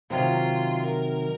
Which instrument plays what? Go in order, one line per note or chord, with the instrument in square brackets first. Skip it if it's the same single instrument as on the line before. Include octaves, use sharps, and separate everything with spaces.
[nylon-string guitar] C3 D#3 F#3 [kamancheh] F4
[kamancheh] A#4